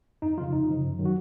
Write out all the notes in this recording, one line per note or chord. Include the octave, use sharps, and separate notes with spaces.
F2 D#4
C#3 F3 F4
F2 D#4
C#3 F3
F#2
D#3 F#3
F#4